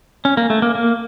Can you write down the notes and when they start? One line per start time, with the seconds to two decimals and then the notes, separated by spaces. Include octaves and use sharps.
0.25 C#4
0.37 A#3
0.50 A3
0.62 A#3
0.75 A#3